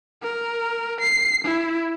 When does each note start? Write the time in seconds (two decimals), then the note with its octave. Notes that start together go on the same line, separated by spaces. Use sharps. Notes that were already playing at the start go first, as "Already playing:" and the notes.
0.22 A#4
1.01 C7
1.45 E4